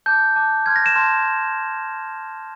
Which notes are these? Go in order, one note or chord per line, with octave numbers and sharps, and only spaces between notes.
A5 D6 F#6 G6
A5 D6 F#6
A5 C6 F6 G#6
A#6
E7
A5 C6 F6